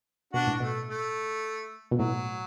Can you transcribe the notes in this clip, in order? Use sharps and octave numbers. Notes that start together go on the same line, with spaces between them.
B2 D4 F#4
A2
B2 A3
A3
B2
A2 F#3